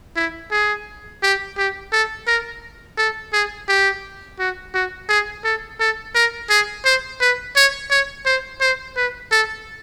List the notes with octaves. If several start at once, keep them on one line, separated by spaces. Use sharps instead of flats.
E4
G#4
G4
G4
A4
A#4
A4
G#4
G4
F#4
F#4
G#4
A4
A4
A#4
G#4
C5
B4
C#5
C#5
C5
C5
B4
A4